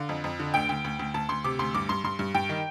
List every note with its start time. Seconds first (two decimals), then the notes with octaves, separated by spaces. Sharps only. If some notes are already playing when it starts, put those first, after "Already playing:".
Already playing: D3 F5
0.09 F2
0.24 F2
0.39 D3
0.54 D2 G5
0.69 D2 G5
0.84 D2
0.99 D2
1.14 D2 A5
1.29 D2 C6
1.44 C3 D6
1.59 D2 C6
1.74 G2 D6
1.89 G2 C6
2.04 G2 C6
2.19 G2
2.35 G2 G5
2.49 D#3